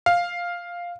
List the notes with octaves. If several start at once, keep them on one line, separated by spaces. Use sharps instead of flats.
F5